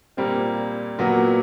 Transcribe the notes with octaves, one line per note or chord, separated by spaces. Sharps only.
A#2 G3 A#3 C4
A#2 F#3 A#3 B3